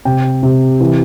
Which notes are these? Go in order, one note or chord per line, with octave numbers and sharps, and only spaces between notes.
C3 G5
C3
E3